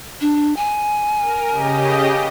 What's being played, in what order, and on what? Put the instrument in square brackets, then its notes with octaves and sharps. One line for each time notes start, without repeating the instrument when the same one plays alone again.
[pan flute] D4
G#5
[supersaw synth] A#4
C#3 G4 D#5